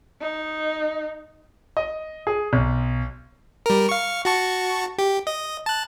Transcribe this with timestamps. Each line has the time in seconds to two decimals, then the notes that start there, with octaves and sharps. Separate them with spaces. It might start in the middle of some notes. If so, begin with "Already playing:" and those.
0.21 D#4
1.77 D#5
2.27 G#4
2.53 B1
3.66 G3 A#4
3.89 F5 C#6
4.25 F#4 A5 C#6
4.98 G4
5.27 D#5
5.66 A5 F#6